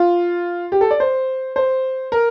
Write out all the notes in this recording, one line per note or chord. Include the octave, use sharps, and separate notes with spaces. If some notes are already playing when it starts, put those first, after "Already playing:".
Already playing: F4
G4
A4
D5
C5
C5
A#4